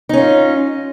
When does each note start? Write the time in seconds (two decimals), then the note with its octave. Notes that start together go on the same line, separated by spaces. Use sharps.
0.09 D#4
0.13 C#4
0.17 F4